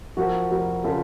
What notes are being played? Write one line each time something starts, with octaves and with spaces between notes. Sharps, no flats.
F3 F#4 A#4
F1 F#4 A#4
C#3 F4 A4